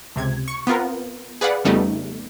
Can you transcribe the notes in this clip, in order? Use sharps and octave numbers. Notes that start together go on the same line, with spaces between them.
C#2 C3 G#6
C#6 C#7
B3 C4 F4 A#4
G#4 B4 D5 F5 F#5 B5
F2 C#3 G3 A3 B3 D#4